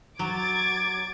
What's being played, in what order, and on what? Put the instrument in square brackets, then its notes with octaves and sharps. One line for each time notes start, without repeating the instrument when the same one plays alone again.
[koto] F#3 [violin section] D6 G#6 A6